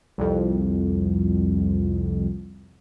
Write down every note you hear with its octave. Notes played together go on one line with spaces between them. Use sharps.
C2 F2